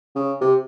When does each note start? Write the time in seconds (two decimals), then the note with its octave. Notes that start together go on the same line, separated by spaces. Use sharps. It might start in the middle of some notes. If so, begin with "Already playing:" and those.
0.15 C#3
0.41 C3